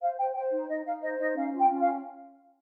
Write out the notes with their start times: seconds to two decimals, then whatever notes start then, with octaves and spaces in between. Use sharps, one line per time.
0.01 C5 F5
0.18 C5 G5
0.35 C5 G5
0.51 D#4
0.68 D#4 D#5
0.85 D#4 F5
1.02 C5 D#5
1.19 D#4 D#5
1.36 C#4 F5
1.53 F4 G5
1.69 C#4
1.81 F5